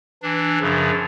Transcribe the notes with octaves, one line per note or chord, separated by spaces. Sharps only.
E3 D4
F#2 C#3 F3